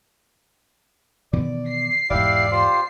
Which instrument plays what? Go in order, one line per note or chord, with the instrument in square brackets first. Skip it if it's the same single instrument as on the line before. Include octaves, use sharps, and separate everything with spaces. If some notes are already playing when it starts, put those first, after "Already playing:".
[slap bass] B2 D#3 E3 [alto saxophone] D5
[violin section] C7
[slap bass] E1 G#2 [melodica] E4 G4 F5 [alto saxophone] D5
[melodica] F4 G4 C5